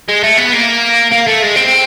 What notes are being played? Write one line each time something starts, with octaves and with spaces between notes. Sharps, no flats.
G#3
A3
B3
A#3
A#3
A3
G#3
C4